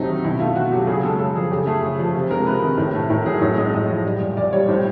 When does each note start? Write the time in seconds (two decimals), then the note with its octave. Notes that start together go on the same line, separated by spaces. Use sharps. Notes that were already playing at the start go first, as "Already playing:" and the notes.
Already playing: C3 F#3 A3 D#4
0.08 D#3
0.24 B2 E4
0.40 A3 F4
0.56 B2 F#4
0.72 F#3 G4
0.87 C#3 G#4
1.03 G#3 A4
1.19 C#3 A4
1.35 F3 G#4
1.51 C#3 G4
1.67 A3 G#4
1.83 C#3
1.99 F3
2.15 C3
2.30 G#3 A#4
2.46 C3 B4
2.62 D#3
2.78 A2
2.94 A3
3.09 A2 A#4
3.26 F#3 G#4
3.41 A2 C#5
3.58 G#3 D#5
3.74 A2 D#5
3.89 F3
4.05 G3
4.21 A#2
4.37 A#2 D5
4.53 G3 C#5
4.68 A2 C5